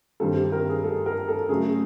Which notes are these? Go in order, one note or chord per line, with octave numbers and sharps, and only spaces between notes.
G2 D#3 G3 C4 A4
G4
A#4
G#4
A4
A#4
A4
C#3 F#3 A3 G#4